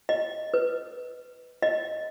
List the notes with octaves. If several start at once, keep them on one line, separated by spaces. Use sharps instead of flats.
D#5
B4
D#5